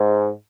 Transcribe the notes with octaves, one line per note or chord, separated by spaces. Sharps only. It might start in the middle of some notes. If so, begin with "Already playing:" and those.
Already playing: G#2